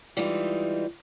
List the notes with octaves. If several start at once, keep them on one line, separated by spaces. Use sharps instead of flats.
E3 G3 G#3 D#4 F4